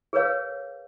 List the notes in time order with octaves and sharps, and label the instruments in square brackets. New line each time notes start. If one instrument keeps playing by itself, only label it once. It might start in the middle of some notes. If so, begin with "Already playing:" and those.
[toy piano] G#4 A#4 B4 C#5 F5